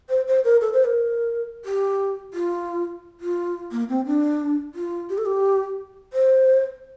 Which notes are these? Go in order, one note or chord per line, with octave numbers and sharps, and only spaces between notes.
C5
C5
A#4
A4
C5
A#4
G4
F4
F4
A#3
C4
D4
F4
G4
A4
G4
C5